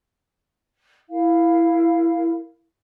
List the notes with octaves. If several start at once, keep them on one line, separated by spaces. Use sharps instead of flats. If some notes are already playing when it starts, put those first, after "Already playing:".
E4 A#4 F5